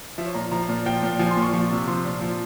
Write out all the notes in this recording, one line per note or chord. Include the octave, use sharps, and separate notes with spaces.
F3 E5
C#5
A#2 A#5
F3 A#5
A#2
F3 G5
A#2
F3 G#5
C6
A#2
C#6
F3 C#6
C3
F3 C6
A#2
F3